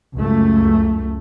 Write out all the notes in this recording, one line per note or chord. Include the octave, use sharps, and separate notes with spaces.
C#2 F#2 A3